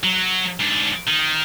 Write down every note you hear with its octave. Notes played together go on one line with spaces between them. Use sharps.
F#3
G#2 D4
D#3